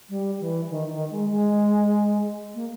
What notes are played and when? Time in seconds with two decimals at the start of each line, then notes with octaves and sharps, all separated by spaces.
0.09 G3
0.40 E3
0.70 D#3
0.91 D#3
1.11 G#3
1.32 G#3
2.54 A#3